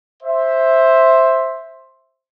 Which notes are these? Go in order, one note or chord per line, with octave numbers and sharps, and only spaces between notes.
C5 E5